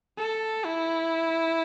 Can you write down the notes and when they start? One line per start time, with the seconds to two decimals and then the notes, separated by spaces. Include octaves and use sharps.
0.18 A4
0.65 E4